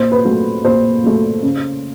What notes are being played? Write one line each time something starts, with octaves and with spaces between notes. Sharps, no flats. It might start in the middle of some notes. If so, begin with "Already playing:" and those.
Already playing: A#2 C5
B4
F#3 A3
A#2 C5
F#3 A3
C#3